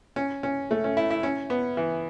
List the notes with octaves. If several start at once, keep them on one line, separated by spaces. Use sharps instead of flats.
C#4
C#4
A3
C#4
E4
E4
C#4
B3
E3